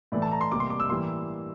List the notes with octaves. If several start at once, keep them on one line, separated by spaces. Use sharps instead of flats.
A2 E3 A3 D5
A5
A#5
C6
C3 G3 A#3 D6
C6
D6
E6
A2 E3 G3 A#3 C6